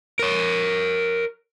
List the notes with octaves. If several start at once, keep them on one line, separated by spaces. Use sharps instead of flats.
A#4 C#5